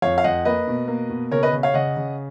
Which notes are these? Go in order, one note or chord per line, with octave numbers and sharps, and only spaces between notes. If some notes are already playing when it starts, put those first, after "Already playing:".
F2 C#5 F5
F5
F2 D#5 F#5
A#3 B4 D#5
B2
A#3
B2
C#3 A#4 C#5
B4 D#5
C#3
C#5 F5
C#3 D#5 F#5
C#3